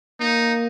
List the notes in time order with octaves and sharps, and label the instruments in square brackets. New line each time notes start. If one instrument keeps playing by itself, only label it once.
[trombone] A#3 [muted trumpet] D#4